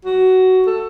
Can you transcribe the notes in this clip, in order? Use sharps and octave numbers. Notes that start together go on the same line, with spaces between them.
F#4
A4